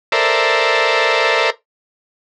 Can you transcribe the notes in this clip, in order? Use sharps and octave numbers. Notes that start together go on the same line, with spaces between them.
A4 A#4 C5 D5 E5